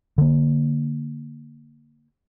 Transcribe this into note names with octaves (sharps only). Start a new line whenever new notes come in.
D3 A#3